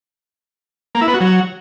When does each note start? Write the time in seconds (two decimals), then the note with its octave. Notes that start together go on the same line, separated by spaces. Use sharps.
0.95 A#3
1.01 E4
1.08 B3
1.14 F#4
1.20 F#3